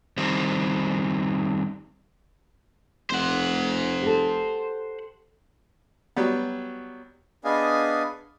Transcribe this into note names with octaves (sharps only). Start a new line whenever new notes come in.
D#3 G3 C4
F1 C5 F#5
G4 A4
F#3 G3 B3
B3 D4 G#4 D#5 F5 G#5